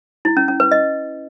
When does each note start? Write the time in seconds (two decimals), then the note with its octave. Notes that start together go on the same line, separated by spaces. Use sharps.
0.25 E4
0.37 C#4
0.48 C#4
0.60 B4
0.71 D#5